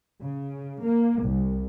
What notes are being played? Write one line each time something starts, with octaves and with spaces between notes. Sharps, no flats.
C#3
A#3
C2